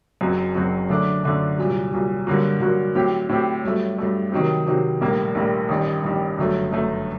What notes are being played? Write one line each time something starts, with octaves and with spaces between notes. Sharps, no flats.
F#1 F#2 F#3 C4 F#4
F#1 F#2 F#3 C4 F#4
F#2 D3 A3 D4
F#2 D3 A3 D4
C2 A#2 F#3
C2 A#2 F#3
G2 D3 F#3 A#3 F#4
G2 D3 F#3 A#3 F#4
A2 F#3 C4 G4
A2 F#3 C4 G4
G2 F#3 A3
G2 F#3 A3
C3 D#3 F#3 C4
C3 D#3 F#3 C4
A#1 A2 G3 A#3
A#1 A2 G3 A#3
A1 G2 D#3 G3
A1 G2 D#3 G3
G1 F#2 F#3 A3
G1 F#2 F#3 A3